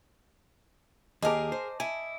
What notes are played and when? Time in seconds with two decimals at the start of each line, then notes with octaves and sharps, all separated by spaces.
1.22 D#2 G4 G#4 A#4 D#5 A5 D6
1.52 C5
1.80 E4 G#5